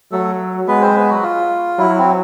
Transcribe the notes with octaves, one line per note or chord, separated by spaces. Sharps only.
F#3 A3 A4
G#3 B3 B4
C4 C5
B3 B4
F#3 F#4
F4
F#3 E4
C4